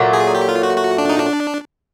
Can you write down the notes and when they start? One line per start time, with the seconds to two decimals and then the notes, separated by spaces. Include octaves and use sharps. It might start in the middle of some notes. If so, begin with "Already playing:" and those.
Already playing: A#2 F#3 A3
0.13 G#4
0.35 G4
0.49 F4
0.63 F#4
0.77 F#4
0.98 D4
1.09 D#4
1.19 D4